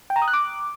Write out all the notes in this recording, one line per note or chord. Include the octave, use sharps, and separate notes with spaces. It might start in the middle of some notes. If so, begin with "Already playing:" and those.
G5
A#5
D#6
F#6
D6